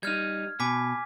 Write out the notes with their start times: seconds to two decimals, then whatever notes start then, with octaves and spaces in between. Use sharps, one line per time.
0.03 G3 D#4 F6 G#6
0.60 B2 G#5 D6 B6